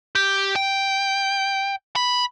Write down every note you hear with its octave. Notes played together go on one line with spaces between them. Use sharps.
G4
G5
B5